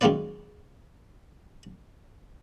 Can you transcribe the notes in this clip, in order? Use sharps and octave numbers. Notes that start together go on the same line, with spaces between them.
F#2 D#3 G#3 A#3 B4 D5